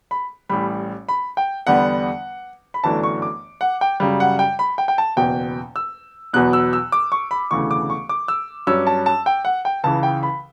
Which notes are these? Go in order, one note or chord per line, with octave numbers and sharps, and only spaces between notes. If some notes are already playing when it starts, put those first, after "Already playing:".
B5
A1 A2 G3 B5
B5
G5
E2 D3 G3 B3 D4 F#5
B5
G1 F#2 E3 A3 D4 A5
C#6
D6
F#5
G5
F#2 C#3 G3
F#5
G5
B5
G5
G5
A5
F#1 E2 B2 G5
E6
E2 B2 F#3 B3 F#6
E6
E6
D6
C#6
B5
E1 D2 C#3 E3 A3 C#6
D6
C#6
D6
E6
G2 F#3 C#4 E6
A5
A5
G5
F#5
G5
C#2 C#3 E3 A5
G5
B5